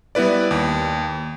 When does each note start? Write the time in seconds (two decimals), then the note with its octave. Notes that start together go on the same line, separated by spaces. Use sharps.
0.15 G3 B3 E4 B4 D5
0.51 D#2